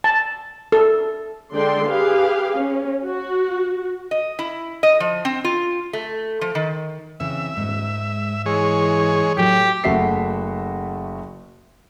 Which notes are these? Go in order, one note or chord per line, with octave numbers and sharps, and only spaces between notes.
A5
A4
D3 G#3 A4 D5 G5 C6
G4 G#4 B4 F5
C#4
F#4
D#5
E4
D#5
F3
C4
F4
A3
F3
D#3
C#3 E3 C4 E5
D#1 G#2
G#3
E3 G#3 C#5
A2 F#3 A3 G4
F#1 A3 F#4 E5 B6 C7